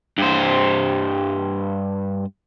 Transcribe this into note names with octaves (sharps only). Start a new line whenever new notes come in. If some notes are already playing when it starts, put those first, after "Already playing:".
G2 C5